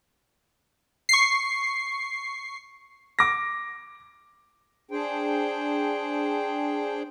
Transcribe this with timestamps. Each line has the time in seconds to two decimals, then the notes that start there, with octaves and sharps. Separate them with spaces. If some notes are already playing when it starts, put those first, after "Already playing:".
1.09 C#6 C7
3.19 D6 A#6
4.91 D4 G#4 C5 G5